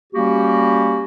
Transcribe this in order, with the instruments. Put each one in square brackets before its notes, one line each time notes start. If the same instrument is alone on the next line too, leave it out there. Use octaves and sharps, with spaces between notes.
[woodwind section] G3 A#3 C#4 F#4 G4